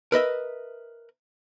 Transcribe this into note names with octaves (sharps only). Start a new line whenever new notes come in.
A#4 B4 D#5 E5